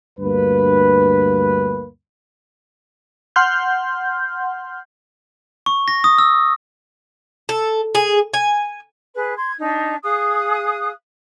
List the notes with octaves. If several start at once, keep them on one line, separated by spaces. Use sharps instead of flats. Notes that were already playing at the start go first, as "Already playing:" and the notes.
D2 G2 A#3 B4
F#5 C6 F6 G6
C#6
A#6
D#6
E6
A4
G#4
G#5
G#4 B4 F#6
C6 G#6
D4 D#4
G#4 F5 D#6 F#6